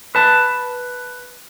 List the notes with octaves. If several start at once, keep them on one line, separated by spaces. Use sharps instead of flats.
B4 A5